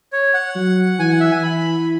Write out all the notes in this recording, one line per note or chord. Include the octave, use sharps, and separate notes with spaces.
C#5
F#5
F#3
E3 G#5
F#5
E5
G#5
E3 B5